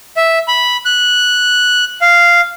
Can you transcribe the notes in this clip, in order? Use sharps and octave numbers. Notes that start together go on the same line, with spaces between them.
E5
B5
F#6
F5